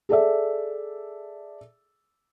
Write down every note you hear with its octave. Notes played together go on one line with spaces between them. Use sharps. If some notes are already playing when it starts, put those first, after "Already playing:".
G#4 A4 D5 E5